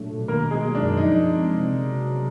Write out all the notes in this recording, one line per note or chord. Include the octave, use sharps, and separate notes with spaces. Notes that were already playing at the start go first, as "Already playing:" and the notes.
Already playing: A#2 F#3 A3 D4
B2
D#3 A#3 A#4
F#3
G#3 G#4
A#3
D4
F#2
F3 D#4
G#3
C4
C3
C#3
F#3
B3